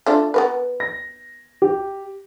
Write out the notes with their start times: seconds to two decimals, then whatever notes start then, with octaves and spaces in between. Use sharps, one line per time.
0.06 A3 D4 F4
0.34 B3 A#4 B4
0.80 A#6
1.62 G4